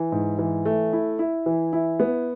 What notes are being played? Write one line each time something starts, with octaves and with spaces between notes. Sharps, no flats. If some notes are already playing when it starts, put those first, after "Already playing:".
Already playing: E3
G#2
E3
A3
E4
E4
E3
E4
B3